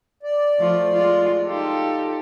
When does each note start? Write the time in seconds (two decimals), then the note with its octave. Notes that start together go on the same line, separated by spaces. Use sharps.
0.23 D5
0.59 F3 A3 F4
0.93 G#3 F4
1.46 D#4 F4 G4 A4